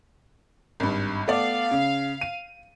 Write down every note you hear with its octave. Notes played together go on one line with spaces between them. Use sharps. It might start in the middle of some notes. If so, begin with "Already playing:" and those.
G#1 G2
A3 B3 D5 F5
C#3
D#7